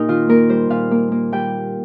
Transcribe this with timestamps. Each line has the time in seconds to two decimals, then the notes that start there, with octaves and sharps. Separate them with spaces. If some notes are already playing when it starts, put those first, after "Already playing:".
Already playing: A#2 A#3 D#4 G4 A#4
0.08 D#3 F4
0.29 A#3 A#4
0.49 G3 C5
0.70 A#2 F5
0.91 A#3
1.12 A#3
1.32 G3 G5